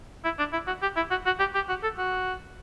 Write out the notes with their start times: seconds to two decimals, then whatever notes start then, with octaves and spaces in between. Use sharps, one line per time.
0.24 E4
0.39 D4
0.53 E4
0.67 F#4
0.82 G4
0.96 E4
1.10 F#4
1.26 F#4
1.39 G4
1.55 G4
1.69 F#4
1.83 A4
1.98 F#4